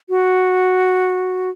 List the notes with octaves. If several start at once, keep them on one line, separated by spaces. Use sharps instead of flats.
F#4